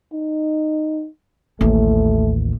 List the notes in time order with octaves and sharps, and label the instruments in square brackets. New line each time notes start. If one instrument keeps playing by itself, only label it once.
[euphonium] D#4
[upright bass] A1 D#2 [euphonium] A3